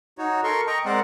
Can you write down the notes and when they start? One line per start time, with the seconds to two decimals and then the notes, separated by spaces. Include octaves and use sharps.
0.18 D#4 F#4 C#5
0.44 A4 A#4 C6 C#6
0.67 D#5 G5 A#5 C#6
0.85 G#3 C4 A#4 C5 D5 F#5